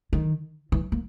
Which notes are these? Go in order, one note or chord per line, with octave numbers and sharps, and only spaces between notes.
D#3
E3
A#3